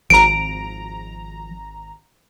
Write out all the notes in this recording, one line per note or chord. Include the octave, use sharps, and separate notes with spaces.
G#1 F3 A#5 D7